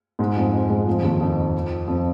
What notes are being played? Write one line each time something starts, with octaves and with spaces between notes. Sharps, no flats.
G#2 G#3
F2 F3
G#2 G#3
F2 F3
D#2 D#3
F2 F3
F2 F3